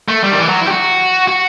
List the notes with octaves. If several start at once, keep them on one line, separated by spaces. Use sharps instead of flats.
A3
G3
D#3
E3
F#3
E4
G4
F#4
F#4